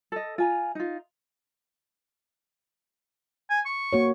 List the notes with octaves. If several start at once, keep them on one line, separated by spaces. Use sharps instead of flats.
A4 D#5
F4 G#5 A#5
D#4 F4
G#5
C#6
A#3 F#4 C#5